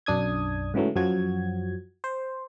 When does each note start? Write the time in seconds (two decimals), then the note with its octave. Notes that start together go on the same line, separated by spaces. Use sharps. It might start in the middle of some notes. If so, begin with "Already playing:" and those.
0.06 B1 F#2 D4 D#6 G#6
0.74 G#2 C#3 E3 F#3 A3
0.96 F#2 F3 F#3 F#4 G#6
2.04 C5